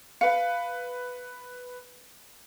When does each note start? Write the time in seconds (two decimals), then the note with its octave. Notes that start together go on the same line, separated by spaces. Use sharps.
0.21 B4 F5 C#7